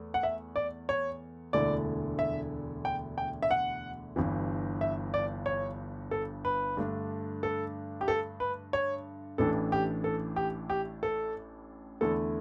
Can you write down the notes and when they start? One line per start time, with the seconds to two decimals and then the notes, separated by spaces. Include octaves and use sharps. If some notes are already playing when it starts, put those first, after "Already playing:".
Already playing: E2 A3
0.14 F#5
0.23 E5
0.56 D5
0.89 C#5
1.53 E1 D2 D3 A3 E4 D5
2.19 E5
2.85 G5
3.18 G5
3.42 E5
3.51 F#5
4.16 G1 G2 E3
4.81 E5
5.14 D5
5.46 C#5
6.11 A4
6.45 B4
6.77 G2 D3 A3 D4
7.43 A4
8.01 G4
8.08 A4
8.40 B4
8.73 C#5
9.38 A1 A2 E3 A3 D4 A4
9.72 G4
10.04 A4
10.36 G4
10.70 G4
11.03 A4
12.01 E2 D3 A3 E4 A4